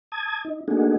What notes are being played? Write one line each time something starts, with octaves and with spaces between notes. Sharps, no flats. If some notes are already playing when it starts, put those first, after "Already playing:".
A5 D#6 G#6
D#4
A3 A#3 D4 D#4 F#4 G#4